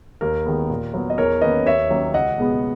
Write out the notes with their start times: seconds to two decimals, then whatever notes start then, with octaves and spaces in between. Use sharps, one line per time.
0.21 D#2 A#4
0.45 D#3 G#3 B3
0.70 A#2
0.94 F#3 B3
1.10 D#5
1.18 E2 A#4 C#5
1.41 D#3 A#3 C#4 B4 D#5
1.66 D#2 C#5 E5
1.90 D#3 F#3 A#3 C#4
2.14 C#2 D#5 F#5
2.38 B2 G#3 B3